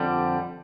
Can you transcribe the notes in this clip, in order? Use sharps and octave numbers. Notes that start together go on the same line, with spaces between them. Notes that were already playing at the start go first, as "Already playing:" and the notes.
Already playing: F2 D3 G3